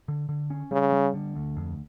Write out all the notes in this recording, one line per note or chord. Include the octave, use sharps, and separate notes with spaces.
D3
D3
C#4
C#3 G3
G3
D3
D2
F2